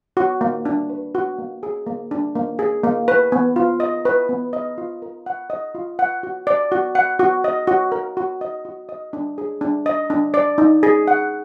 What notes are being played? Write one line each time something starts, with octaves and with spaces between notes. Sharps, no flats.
F#4
A#3
D4
B4
F#4
A#3
G#4
A#3
D4
A#3
G#4
A#3
B4
B3
F4
D#5
B4
B3
D#5
F4
A#4
F#5
D#5
F4
F#5
F#4
D5
F#4
F#5
F#4
D#5
F#4
A#4
F#4
D#5
F#4
D#5
D4
G#4
D4
D#5
D4
D5
D#4
G#4
F#5